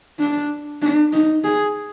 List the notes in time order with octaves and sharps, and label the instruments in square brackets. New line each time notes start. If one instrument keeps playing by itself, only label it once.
[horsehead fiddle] D4
D4
D#4
G#4